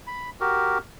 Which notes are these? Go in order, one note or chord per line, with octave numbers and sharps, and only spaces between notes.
B5
F#4 G4 A#4